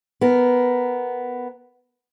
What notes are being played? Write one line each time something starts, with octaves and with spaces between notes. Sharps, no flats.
B3 A#4